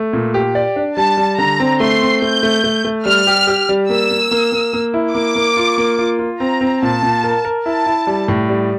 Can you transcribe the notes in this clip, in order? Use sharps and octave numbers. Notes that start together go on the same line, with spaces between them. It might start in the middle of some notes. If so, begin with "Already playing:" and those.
Already playing: A3
A#2
G4
D5
D4
G3 A5
G3
D3 A#5
C4
A3 C6
C4
A3 G6
A3
A3
A3
G3 F6
G4
G4
G3
A#3 E6
A#3
A#3
A#3
A#3
E4
A#3 D6
A#3
F4
A#3
F4
F4
C4 A#5
C4
A#2 A5
A#2
A#4
A#4
E4 A5
E4
G3
A2
G3